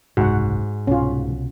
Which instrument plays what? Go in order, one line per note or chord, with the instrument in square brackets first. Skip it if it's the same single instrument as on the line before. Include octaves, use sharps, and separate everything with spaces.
[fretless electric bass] F#1 C2 [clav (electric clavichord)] G#2 [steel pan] F#4 F#5
[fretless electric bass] C2 B2 [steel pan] C#4 F4